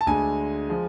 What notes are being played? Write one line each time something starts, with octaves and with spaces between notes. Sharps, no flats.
A5
D2 D3 G#3 G#5
F3 G#3